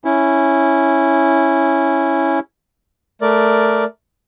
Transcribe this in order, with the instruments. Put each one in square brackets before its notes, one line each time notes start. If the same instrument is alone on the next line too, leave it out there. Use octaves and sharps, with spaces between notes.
[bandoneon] C#4 E4
[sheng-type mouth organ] A3 A#4 D5